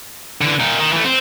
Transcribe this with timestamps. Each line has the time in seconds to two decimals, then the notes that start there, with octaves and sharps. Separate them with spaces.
0.41 D3 E3
0.60 A#2 D#4
0.79 D#3
0.93 E3 A3
1.04 C4